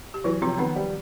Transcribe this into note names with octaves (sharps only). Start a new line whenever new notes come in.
G4
E3 F#3 F#4
C3 F3 F4
D#3 B3 D#4
G3